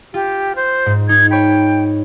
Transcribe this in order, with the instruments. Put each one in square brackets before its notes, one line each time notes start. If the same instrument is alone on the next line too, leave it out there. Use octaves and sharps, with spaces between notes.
[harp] F4 [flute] G4
[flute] C5
[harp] G#2
[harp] D#4 [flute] G#6
[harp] C#5 B5 [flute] G5